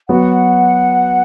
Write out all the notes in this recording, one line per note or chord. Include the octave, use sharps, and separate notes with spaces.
F#3 B3 F#4 F#5